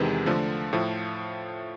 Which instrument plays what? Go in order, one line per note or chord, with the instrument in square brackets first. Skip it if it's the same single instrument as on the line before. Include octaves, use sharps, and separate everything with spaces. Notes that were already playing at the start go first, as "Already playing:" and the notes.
Already playing: [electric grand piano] E2 C3 D#3 G#3 B3
D3 F3 A3
A2 F3 A3